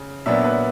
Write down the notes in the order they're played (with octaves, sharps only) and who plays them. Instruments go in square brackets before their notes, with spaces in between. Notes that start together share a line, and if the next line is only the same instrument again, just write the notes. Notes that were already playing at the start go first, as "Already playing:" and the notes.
Already playing: [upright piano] C#3
A#2 F#3 B3 D4 E5
B4